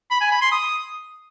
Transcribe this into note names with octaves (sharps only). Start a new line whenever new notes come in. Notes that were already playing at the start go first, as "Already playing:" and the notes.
B5
G#5
B5
C6
D#6